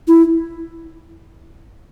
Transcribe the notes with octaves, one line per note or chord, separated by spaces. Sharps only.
E4